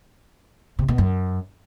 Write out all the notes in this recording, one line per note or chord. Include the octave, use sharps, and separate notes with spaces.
C3
B2
F#2